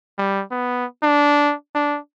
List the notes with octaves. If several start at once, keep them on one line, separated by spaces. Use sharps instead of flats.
G3
B3
D4
D4